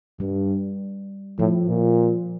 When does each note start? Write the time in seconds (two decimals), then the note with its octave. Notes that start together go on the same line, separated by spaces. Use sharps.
0.20 G2 G3
1.39 A2 F3
1.69 A#2